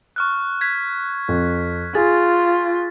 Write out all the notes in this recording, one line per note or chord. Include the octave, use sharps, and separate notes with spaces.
C#6 F6 F#6
G#6 B6
F2
F4 G#4 A6